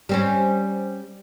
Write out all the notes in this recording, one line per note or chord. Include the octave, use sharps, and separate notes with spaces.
G3 C4 C#4